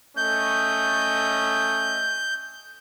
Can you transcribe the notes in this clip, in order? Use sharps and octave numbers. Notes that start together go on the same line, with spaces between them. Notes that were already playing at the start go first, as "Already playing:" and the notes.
A3 C#4 D#5 G6